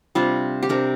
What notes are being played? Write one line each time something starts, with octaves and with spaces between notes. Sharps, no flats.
C3 G3 D4 F4
G4
C3 G3 D4 A#4